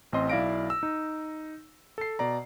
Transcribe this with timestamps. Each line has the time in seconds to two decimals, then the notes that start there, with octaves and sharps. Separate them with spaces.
0.13 A1 C4 D#5 C6
0.29 B1 E4 D5 F5 A#6 D7
0.70 E6
0.83 D#4
1.98 A4 C7
2.19 B2 D5 A#5